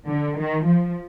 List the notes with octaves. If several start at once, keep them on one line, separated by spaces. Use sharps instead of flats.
D3
D#3
F3